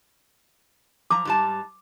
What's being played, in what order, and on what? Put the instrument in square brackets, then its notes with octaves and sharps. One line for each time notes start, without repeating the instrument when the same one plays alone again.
[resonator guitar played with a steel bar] F3 A#5 [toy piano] D6
[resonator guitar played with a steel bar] G#2 G3 A5